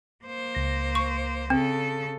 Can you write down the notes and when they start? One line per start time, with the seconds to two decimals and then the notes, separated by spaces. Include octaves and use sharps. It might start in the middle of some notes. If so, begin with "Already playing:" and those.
0.25 A#3 C5
0.55 C#2 A#6
0.95 C#6
1.50 C#3 C4 A4